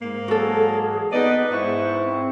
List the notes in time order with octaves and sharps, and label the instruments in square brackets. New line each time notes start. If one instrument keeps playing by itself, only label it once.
[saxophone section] G#2 A#3
[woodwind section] E3 F#3 [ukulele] F#4 A4 [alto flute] G#4
[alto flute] B3 [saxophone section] D#4 D5 D#5 [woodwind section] B4
[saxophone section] G#2 E4 [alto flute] C5 [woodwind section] C#6
[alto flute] C4